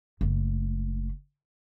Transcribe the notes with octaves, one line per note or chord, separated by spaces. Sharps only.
F#1 A3